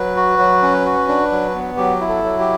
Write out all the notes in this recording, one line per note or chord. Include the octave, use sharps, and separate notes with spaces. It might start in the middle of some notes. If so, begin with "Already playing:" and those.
Already playing: F#3 B4
F#4
F#3
C#4
F#4
D4
F#3
B3
F#3 G4
E4
A4
F#3
G4